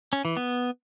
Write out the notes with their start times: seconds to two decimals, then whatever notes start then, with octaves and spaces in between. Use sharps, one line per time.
0.13 C#4
0.25 E3
0.37 B3